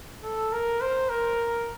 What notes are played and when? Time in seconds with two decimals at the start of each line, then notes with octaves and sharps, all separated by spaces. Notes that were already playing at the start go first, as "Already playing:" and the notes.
0.23 A4
0.52 A#4
0.81 C5
1.09 A#4